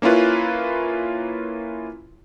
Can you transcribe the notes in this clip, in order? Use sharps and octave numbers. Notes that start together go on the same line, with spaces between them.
A#3 C#4 E4 F4 B4